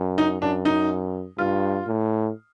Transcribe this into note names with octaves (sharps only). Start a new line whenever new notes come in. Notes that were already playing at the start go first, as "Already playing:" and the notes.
Already playing: F#2
D#4
F#2 D4
D#4
G2 F4
A2